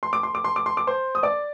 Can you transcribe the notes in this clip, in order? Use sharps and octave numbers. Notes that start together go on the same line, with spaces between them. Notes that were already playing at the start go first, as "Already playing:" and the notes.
C6
D6
C6
D6
C6
D6
C6
D6
C5 C6
D#6
D5 D6